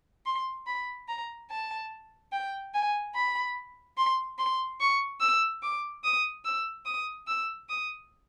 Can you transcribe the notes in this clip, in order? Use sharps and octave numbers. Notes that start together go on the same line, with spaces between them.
C6
B5
A#5
A5
G5
G#5
B5
C6
C6
C#6
E6
D6
D#6
E6
D#6
E6
D#6